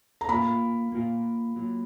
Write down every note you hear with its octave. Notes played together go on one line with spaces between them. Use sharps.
A#5
A#3 F4 A#4 F5 B5
A#3 F4 A#4 F5
F#3 A#3 F4